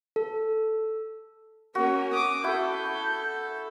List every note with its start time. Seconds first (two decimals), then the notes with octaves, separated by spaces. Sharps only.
0.16 A4
1.75 A#3 C#4 F#4
2.13 D6 D#6
2.44 E4 F#4 A4 E5 G6
2.85 A5